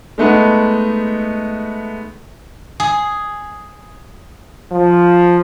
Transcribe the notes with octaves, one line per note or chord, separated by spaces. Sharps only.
G#3 A3 B3 D#4
G#4
F3